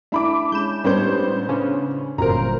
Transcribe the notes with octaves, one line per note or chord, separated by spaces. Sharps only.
A3 D4 E4 E5 B5 D6
G#3 C#4 G6 E7
A1 G3 B3 D4 C5 C#5 G6
C#3 C#4 D4
G1 F#2 A#2 F4 A#4 C5 A#5